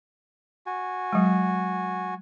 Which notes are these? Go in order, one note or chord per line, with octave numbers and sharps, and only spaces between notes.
F#4 G#5
F#3 G#3